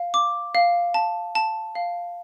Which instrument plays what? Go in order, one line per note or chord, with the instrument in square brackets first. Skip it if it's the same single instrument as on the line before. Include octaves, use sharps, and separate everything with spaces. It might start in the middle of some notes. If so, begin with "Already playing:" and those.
Already playing: [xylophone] F5
D6
F5
A5
A5
F5